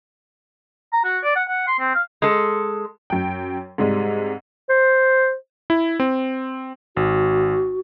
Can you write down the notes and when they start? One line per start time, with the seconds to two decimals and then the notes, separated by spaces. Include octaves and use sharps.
0.93 A#5
1.05 F#4
1.23 D5
1.36 F#5
1.48 F#5
1.67 C6
1.80 C4
1.94 F5
2.22 G#3 A4
3.10 F#2 G5
3.78 G#2 C3 G3 G#3
4.70 C5
5.70 E4
6.00 C4
6.97 G#1 F#4